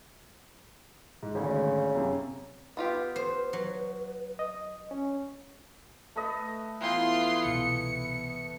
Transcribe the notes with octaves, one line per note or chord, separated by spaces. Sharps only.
G#2
G#1 D2 C#3
F#2 C3
B3 F4 G4 B4
C5
F#3
D#5
C#4
A3 B4 D#5
E3 B3 F4 G5 C6
C2 B2 C#7